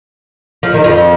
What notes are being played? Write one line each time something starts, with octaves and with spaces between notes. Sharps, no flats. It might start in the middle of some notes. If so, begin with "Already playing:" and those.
F3
D#3
F2 F3